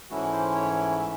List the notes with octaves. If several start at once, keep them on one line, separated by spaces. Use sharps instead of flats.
G#2 E3 A3 C#4 E4 F#4
C5
C#5
E5